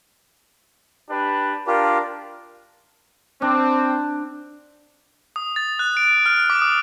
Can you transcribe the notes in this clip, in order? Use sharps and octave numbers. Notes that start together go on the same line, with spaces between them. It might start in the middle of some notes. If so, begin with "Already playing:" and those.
D4 G4 B4
D4 F4 G4 A#4
C4 D4
D#6
A6
F#6
D7
F6
D6
D#6